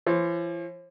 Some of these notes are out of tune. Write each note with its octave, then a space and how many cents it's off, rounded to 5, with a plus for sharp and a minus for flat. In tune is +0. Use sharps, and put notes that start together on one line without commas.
E3 +45 C5 +45